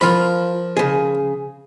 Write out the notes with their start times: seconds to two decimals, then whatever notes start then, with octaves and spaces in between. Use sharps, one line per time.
0.01 F3 F4 A#4 B5
0.77 C#3 G#4